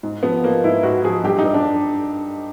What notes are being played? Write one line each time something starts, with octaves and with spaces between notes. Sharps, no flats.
G#2
F3 B3
F3 A#3
G#2 E4
G#2 F#4
F3 G#4
G2 G4
D#4
G2
D4